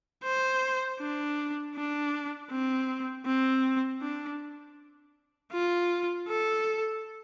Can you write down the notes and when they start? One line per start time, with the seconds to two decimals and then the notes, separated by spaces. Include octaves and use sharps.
0.24 C5
1.00 D4
1.75 D4
2.50 C4
3.26 C4
4.02 D4
5.52 F4
6.28 A4